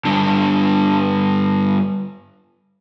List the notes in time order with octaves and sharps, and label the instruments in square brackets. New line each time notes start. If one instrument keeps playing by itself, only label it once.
[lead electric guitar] G2 D3